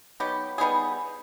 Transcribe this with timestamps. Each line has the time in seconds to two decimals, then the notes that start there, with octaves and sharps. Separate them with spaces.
0.20 F#3 B3 D#4 G4
0.58 G3 B3 D#4 G#4